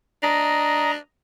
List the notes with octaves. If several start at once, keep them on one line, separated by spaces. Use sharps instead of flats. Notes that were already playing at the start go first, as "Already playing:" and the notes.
D4 D#5 A#5